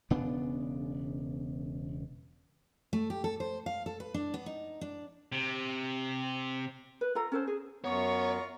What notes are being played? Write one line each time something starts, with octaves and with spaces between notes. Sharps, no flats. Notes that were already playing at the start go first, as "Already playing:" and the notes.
E1 C#3 B3 D4
A3
G4
A4
C5
F5
A4
B4
D4
B3
D#4
D4
C3
B4
F4 A4 A#5
C#4 A4 C5
G#4
F#2 B3 F4 C#5 A#5 C#6